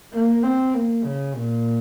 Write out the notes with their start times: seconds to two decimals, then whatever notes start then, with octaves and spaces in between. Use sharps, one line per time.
0.13 A#3
0.44 C4
0.74 A#3
1.04 C#3
1.36 A#2